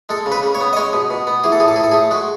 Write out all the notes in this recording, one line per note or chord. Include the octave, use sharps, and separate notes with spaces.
G#3 A4
C#3
B4
C#3
C#5
B3
D#5
G#3 C#5
B2
B2
B3
E3 G#4
A4
A2 G#4
A4
A2 G#4
A4
A3 G#4
G#3 F#4